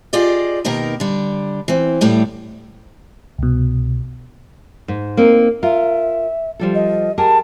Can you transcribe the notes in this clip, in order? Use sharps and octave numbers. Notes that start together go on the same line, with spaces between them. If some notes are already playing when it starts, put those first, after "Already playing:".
F4 G4 G#4 D5 D#5
B2 D#3 A#3 D#4 G4 A#4
D3 G3
E3 C4
A2 G3 A3 G4
C2 B2
G#2
A#3 C4 D#4
F4 A#4 E5
F3 G3 A4
D#5
G4 G#4 A#4 A5